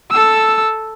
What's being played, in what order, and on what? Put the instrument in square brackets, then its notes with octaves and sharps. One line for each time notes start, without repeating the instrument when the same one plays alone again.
[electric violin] A4 E6